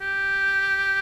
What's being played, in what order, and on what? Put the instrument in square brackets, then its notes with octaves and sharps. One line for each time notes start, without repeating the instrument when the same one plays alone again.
[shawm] G4